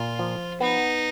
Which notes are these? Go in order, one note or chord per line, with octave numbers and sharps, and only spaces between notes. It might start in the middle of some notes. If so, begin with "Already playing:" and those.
Already playing: A#2 F4
F3
B3 D#4